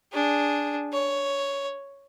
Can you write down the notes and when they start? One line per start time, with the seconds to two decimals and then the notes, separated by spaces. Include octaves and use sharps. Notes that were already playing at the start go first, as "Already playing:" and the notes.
0.12 D4 G#4
0.92 C#5